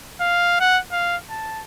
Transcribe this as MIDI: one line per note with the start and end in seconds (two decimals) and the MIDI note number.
0.21 0.59 77
0.60 0.79 78
0.92 1.16 77
1.30 1.63 81